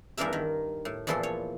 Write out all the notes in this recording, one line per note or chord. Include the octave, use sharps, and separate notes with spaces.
E2 G2 E3 D4 A#4 E5
D#3
A2
E2 A#2 E3 F3 A4 C6
C#5